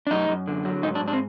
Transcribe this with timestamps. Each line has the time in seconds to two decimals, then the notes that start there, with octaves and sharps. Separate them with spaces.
0.07 D4
0.11 F#2 D#4
0.29 F#2
0.48 D3
0.65 F#3
0.83 G#2 D#4
0.95 D4
1.01 G#2
1.08 D4
1.13 C4